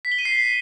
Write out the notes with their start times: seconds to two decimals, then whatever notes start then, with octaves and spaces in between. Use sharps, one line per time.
0.05 B6
0.12 G7
0.18 D#7
0.25 C7